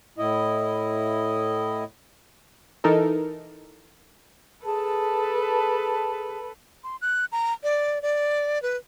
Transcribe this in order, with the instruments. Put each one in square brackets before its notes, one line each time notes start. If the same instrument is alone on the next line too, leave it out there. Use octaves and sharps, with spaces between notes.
[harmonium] A2 E4 D#5
[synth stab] E3 D#4 A4 A#4
[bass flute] G#4 [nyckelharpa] A4 [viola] B4 [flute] A5
[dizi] C6
F#6
A#5
D5
D5
B4